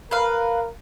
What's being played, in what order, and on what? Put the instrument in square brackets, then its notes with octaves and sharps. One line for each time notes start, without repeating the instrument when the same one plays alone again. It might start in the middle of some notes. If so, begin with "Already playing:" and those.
[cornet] A#4 [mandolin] B4 F5